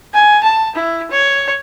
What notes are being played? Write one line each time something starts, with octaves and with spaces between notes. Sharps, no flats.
G#5
A5
E4
C#5